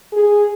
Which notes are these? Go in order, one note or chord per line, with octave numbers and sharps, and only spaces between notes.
G#4